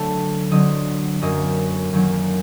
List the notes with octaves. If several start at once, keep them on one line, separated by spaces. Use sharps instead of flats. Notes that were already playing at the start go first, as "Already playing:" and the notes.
Already playing: D3 F#3 A3 A4
D3 F#3 C4 D#5
F#2 F#3 A#3 D#5
F#2 D#3 F#3 A#3